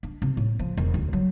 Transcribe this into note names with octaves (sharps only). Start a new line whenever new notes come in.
D4
C3
A2
F3
E1
D2
F#3